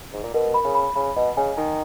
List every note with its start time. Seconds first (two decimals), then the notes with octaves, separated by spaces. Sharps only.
0.13 G#2
0.23 A#2
0.34 B2 A#4
0.54 B5
0.65 C#3
0.75 B5
0.95 C#3 B5
1.16 B2 D#5
1.37 C#3 G#5
1.57 D#3 A#5